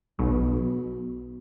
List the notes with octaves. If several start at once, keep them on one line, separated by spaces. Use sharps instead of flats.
B1 B2